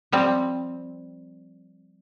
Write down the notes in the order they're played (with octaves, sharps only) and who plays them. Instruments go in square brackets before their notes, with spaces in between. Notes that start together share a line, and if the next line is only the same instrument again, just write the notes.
[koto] F3 G3 C4